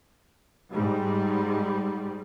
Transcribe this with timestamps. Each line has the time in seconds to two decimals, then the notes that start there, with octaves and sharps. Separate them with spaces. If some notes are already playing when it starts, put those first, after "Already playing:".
0.71 G#2 G3